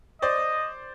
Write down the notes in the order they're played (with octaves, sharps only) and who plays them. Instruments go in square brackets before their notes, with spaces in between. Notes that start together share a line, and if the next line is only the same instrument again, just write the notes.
[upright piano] C5 D5 [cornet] D#5